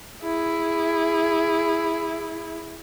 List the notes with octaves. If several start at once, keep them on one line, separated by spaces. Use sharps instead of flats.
E4 G#4